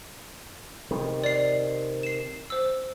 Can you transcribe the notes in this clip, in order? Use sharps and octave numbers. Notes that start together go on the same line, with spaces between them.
C3 D#3
D5 C7
C7 E7
C5 E6